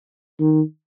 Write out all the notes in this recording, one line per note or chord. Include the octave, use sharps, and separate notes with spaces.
D#3